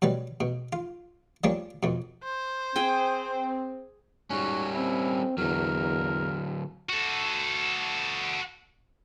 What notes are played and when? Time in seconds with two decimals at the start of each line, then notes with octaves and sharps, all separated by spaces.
0.02 B2 F#3 G3 B4
0.40 B2
0.73 F4
1.44 F3 G3 A#3 C#4 D4
1.83 F2 B2
2.23 C5
2.76 C4 G#4 G5
4.30 G#2 G3 C#4 F#4
4.75 C4 E4
5.38 E2 D3 F#3 A#4
6.89 F#4 A4